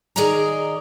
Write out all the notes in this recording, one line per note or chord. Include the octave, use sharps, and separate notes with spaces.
D#3 G#4 A#4 D5 D#5 A#5